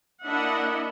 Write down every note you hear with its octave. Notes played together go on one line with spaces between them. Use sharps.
A#3 D4 E4 D#5 E5 F#5